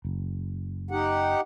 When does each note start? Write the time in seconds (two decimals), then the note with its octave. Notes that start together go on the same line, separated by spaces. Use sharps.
0.05 F#1
0.91 D#4 G4 F#5